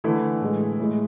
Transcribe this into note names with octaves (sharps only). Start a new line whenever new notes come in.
D3 E3 A3 E4
A2 G#3
A2 G#3